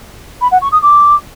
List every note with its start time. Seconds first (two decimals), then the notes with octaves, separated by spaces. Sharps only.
0.41 B5
0.52 F#5
0.62 C#6
0.72 D#6
0.82 D6